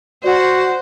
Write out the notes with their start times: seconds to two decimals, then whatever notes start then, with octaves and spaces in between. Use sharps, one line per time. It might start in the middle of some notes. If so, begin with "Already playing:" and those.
0.24 F#4 C5 D5 F#5